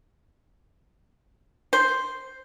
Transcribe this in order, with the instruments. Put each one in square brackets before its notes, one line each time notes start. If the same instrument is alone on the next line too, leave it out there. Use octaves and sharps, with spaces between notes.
[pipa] C5